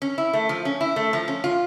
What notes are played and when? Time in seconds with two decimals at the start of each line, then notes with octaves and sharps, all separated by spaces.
0.02 C#4
0.18 E4
0.33 A3
0.49 F3
0.65 C#4
0.81 E4
0.96 A3
1.13 F3
1.28 C#4
1.44 F4